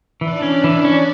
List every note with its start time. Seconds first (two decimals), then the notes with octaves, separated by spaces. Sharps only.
0.20 E3 D4 D5
0.42 C#4
0.64 E3
0.85 C#4